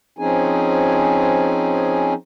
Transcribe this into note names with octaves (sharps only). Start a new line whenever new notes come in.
F3 C4 C#4 D#4 G#4 G#5